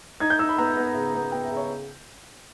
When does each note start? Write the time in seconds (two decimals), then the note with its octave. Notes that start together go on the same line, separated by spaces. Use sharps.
0.20 D#4 G#6
0.30 G6
0.39 D#4 E6
0.49 B5
0.58 B3 A#5
0.77 B3
0.95 C#3
1.14 B3
1.32 B3 G5
1.45 E5
1.51 C#3
1.57 C#5